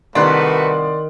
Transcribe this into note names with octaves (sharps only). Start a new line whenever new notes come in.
C2 D#3 A3 F#4 B4 D5 C6 F#6